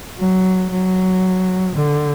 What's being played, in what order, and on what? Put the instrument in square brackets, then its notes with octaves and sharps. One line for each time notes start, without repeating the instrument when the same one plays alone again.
[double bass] F#3
F#3
D3